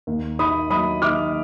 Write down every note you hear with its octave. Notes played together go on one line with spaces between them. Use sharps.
D#2
D#3 B5 D#6
F#3 B5 D#6
D#3 D6 F6